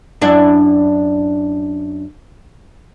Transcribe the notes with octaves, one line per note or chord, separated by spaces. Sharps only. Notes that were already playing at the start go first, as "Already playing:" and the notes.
F#2 D4 E4